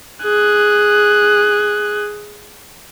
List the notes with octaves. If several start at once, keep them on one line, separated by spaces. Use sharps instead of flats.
G#4 F#6